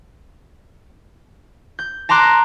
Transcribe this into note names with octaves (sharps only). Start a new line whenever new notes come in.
G6
A5 A#5 C6 D6 F#6 A#6